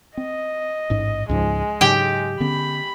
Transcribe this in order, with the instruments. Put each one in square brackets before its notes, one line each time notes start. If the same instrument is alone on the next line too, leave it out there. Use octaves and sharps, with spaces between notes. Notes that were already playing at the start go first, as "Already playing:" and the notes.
[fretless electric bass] C4 [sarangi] D#5
[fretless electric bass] A1 G#2
[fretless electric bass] C#2 G#2 F3 [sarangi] G#3
[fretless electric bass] G#2 C#3 F#3 [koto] G4 G5
[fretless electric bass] D3 B3 C#4 [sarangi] B5